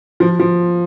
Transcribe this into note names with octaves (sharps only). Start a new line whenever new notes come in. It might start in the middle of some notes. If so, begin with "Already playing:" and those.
F3
F3